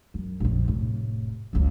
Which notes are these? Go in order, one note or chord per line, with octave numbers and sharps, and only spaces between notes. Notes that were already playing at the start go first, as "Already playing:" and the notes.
F#2
A#1 F2
F1 A2
F#1 C#2